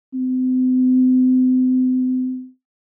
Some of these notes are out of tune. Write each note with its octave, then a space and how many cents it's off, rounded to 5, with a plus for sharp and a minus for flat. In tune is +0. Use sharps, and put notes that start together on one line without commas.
C4 -40